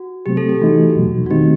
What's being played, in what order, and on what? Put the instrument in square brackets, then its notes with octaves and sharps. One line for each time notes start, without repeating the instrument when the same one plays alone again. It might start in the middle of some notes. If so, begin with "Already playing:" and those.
Already playing: [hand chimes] F#4
[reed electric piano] C3 F#3 A3 C4 [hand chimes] G4
[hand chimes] A4
G4
[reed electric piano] E3 A3 D#4 [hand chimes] F#4
[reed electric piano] E2 B2 F#3
[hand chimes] F#4
[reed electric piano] D#3 A3 C4 D#4 [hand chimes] G4